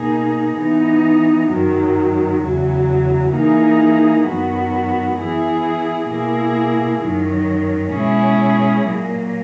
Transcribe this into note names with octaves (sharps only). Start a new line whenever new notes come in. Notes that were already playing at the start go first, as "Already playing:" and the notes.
Already playing: B2 A#3 D#4 G#4
E3 B3 D#4
F#2 D#3 F#3
E2 C#3 F#3
E3 A#3 D#4 G#4
F#2 D#3 F#3 B3 F#4
E3 B3 E4 G#4
B2 A#3 E4 G#4
F#2 D#3 F#3
B2 G#3 C#4 E4 G#4
A#2 F#3 A#3